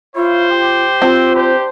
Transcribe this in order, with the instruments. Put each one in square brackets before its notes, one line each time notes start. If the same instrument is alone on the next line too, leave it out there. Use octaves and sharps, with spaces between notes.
[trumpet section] E4 C#5 F5 [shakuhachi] F4 [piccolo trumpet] C5
[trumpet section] G4
[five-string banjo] C4 [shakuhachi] F4
[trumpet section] D4 C5 [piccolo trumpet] G4